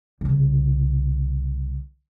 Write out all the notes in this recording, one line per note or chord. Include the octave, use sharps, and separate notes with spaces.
C2 C#3